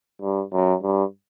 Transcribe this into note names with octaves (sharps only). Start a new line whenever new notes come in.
G2
F#2
G2